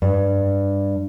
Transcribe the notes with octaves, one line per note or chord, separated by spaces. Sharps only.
G2